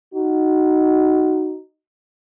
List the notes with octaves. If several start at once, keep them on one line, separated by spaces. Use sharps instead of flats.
D#4 F#4